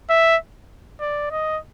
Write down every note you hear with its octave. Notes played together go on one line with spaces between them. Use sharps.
E5
D5
D#5